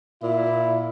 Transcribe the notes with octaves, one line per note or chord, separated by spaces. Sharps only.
A#2 E4